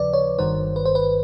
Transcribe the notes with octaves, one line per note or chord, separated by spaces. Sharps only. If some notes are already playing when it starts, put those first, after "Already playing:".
Already playing: D#2 C#3 F3 B4 D5
C#5
G1 G2 D#3 C5
B4
C5
B4